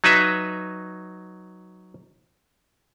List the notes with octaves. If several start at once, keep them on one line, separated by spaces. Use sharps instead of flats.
F#3 D#4 B4 E5